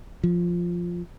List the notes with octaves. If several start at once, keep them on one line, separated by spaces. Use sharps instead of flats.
F3